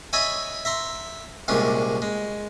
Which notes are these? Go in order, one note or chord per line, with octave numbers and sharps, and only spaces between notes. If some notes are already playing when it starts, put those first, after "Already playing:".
C#5 D#5 E5 G#5 A5 B5
E5 A#5 C6
C2 A#2 G#3 C#4 D4 A5
G#3